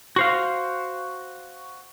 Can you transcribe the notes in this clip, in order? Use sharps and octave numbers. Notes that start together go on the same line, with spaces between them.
F#4 C5 F5